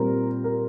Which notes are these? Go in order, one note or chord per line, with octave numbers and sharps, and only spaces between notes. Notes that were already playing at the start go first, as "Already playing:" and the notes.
Already playing: A#2 G3 C4 A#4
A#4